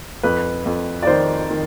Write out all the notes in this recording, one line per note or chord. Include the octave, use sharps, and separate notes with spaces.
F2 B4
F2
D5
D#3 C5
D#3